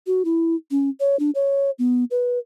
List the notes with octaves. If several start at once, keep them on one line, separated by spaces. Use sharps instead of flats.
F#4
E4
C#4
C#5
D4
C#5
B3
B4